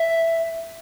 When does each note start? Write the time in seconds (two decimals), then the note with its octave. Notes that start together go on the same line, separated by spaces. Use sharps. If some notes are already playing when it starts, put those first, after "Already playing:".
Already playing: E5